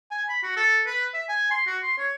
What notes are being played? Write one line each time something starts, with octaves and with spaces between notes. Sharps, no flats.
G#5
B5
F#4
A4
B4
E5
G#5
C6
F#4
C6
C#5